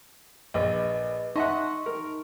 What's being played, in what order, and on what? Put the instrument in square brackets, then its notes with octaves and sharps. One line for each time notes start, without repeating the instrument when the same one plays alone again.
[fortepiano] A#1 [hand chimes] B4 D#5
[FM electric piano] D#4 [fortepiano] D#5 E5 F#5 [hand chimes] A5 C6 C#6
[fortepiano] A#4